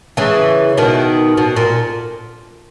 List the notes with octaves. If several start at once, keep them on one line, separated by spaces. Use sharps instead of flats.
C#3 E3
B2 D#3
B2
A#2